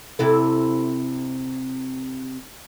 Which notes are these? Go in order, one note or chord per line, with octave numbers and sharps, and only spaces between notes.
C3 E4 A4